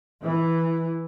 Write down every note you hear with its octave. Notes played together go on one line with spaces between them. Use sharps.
E3